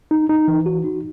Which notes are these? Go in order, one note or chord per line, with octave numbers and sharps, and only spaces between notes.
D#4
D#4
E3
F#4
D#4